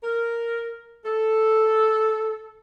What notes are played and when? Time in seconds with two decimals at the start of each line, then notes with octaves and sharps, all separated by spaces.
0.03 A#4
1.05 A4